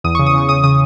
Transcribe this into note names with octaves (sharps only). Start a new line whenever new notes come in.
E2 D#6
C#3 C#6
D#6
C#3 C#6
C#3 D#6
C#3 D#6